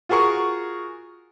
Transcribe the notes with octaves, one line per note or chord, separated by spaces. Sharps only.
F4 F#4 G#4 A#4 C#6